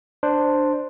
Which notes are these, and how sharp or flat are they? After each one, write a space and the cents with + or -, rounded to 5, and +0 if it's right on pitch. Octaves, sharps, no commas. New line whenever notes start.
D4 +10 C5 +0